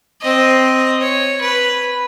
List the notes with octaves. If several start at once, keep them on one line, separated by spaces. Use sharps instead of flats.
C4 D#5
C#5
B4